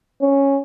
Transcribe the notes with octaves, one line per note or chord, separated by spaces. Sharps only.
C#4